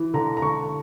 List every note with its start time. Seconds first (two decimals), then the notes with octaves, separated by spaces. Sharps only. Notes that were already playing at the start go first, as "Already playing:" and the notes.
Already playing: E3
0.14 D3 A#5
0.37 A#5
0.42 D3 C#6